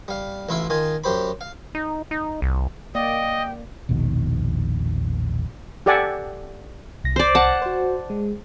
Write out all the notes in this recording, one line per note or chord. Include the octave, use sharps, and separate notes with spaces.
G3 F5
A1 E4 F4 E5 C6
D#3 F4 G#5
F#2 G4 C5 B5
F5
D#4
D#4
C2
A#3 D5 D#5 G5
E1 A#1 B2 D#3
G4 A4 D5 F#5 G#5
C2 A#6
C5 D5
F#5 A5
F#4 C5
G#3